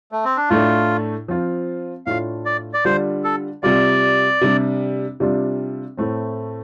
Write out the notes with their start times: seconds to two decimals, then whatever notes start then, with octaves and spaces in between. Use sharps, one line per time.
0.12 A3
0.25 C4
0.37 D4
0.50 A2 A3 D4 F4
1.28 F3 C4 F4
2.06 A2 A3 D4 F4 F5
2.45 D5
2.73 D5
2.85 D3 G3 D4 F4 C5
3.24 A4
3.63 C3 G3 F4 D5
4.41 C3 G3 D4
5.20 C3 G3 D4 F4
5.97 A2 A3 C4